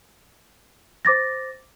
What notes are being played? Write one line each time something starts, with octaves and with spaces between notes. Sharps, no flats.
C5 D6 A6 A#6